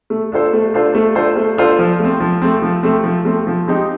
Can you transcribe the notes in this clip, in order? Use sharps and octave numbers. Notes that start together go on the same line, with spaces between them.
A3
D4 F4 A4 C5
A3
D4 F4 A4 C5
A3
D4 F4 A4 C5
A3
D4 F4 A4 C5
F3
A3
C4
F3
A3 C4
F3
A3 C4
F3
A3 C4
F3
G#3 C4 D#4 G4